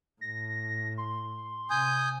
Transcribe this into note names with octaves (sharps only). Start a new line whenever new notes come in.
A2 A#6
C6
C3 G#5 D#6 G6